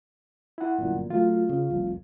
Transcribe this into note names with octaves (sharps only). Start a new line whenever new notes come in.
E4 F#5
G1 F#2 A#2
F#3 A3 F4 F5
C#3
F1 C2 F2